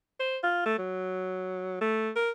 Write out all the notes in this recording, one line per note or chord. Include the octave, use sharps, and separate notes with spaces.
C5
F4
A3
F#3
A3
A#4